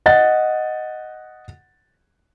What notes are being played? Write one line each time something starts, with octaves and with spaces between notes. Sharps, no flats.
D#5 F#5 A6